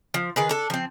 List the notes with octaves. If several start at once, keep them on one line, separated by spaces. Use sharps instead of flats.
F3
D#3 G#4 B4
D4 A4
F3 C4